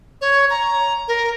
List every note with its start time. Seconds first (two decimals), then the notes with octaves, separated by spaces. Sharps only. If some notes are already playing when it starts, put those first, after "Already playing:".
0.21 C#5
0.50 A#5
1.08 A#4